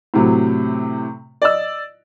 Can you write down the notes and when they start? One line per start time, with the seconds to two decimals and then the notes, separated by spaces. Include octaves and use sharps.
0.14 A2 C3 F#3
1.42 D5 D#5 E6